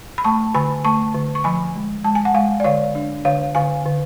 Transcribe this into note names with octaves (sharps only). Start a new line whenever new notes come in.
B5
A3 A5 C#6
D3 G#5 B5
A3 A5 C#6
D3
C#6
F3 G#5 B5
G#3
G#3 A5
G#5
F#5
G#3 F5 G#5
D5
D3 C#5 F5
D4
D3 C#5 F5
D3 F5 G#5
D3